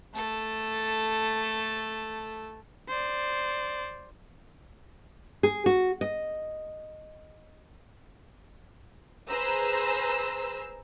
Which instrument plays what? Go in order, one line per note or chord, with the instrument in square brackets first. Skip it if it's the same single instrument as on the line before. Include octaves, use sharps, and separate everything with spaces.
[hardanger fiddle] A3 A4
[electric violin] C5 D5
[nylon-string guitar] G#4
F#4
D#5
[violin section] G#4 B4 C5 A#5 E6